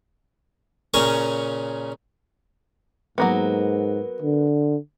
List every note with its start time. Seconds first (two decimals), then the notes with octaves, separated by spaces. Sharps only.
0.94 A#2 C#3 C#4 A#4 G#5 C#6
3.18 G#2 F#3 A#3 B3
4.22 D3